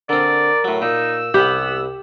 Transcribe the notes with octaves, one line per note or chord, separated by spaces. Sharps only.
D3 C4 A#4 D5
A2 F#3
A#2 D#4 E6
C2 B3 G4 F#5 B5